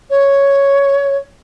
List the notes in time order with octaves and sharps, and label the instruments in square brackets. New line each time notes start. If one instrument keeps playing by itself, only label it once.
[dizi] C#5